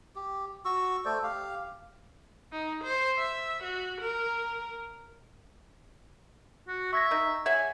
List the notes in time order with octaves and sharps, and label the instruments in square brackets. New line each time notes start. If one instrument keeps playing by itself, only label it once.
[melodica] G4
F#4 C#6 E6
A3 A4 C5 D5
G4 F5
[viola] D#4
C5
E5
F#4
A#4
[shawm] F#4
[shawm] E5 [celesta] C#6 G#6 A#6
[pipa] D#4 A#4
[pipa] G#4 E5 F#5 [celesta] C#5 [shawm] G#5